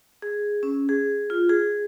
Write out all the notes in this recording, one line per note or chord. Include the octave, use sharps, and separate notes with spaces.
G#4
C#4
G#4
F4
G#4